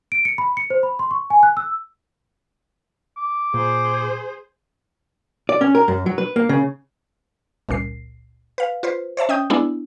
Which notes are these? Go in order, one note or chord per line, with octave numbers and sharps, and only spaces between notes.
D7
C#7
B5
C#7
C5
B5
C6
C#6
G#5
F#6
E6
D6
A#2 G#4 C5
D5
C#4
A#4
F#2
F#3
B4
A#3
C#3
G1 C#2 A#2 C7
B4 F5
F4 B4 C5
C5 C#5 E5 A5
C#4 D#5 G5 D#6 G6
G#3 B3 D4 E4